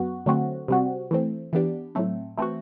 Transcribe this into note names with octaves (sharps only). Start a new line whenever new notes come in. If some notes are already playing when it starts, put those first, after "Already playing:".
Already playing: F#2 B3 F#4
D3 F#3 A3 C4 F#4
C3 G3 C4 F#4
E3 A3 C4
E3 B3 D4 G4
A2 F#3 A3 C4
E3 A3 C4 F#4